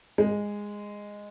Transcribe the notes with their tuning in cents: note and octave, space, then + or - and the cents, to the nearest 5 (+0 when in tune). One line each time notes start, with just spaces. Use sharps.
G#3 -10